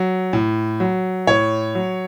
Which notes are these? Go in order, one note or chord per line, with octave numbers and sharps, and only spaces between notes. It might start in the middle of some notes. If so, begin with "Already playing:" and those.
Already playing: F#3
A2
F#3
A2 C#5
F#3